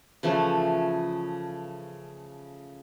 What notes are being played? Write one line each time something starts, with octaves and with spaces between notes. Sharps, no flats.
C#3 E3 F3 A3